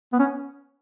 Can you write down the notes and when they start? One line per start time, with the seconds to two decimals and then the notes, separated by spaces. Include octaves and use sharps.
0.13 B3
0.19 C#4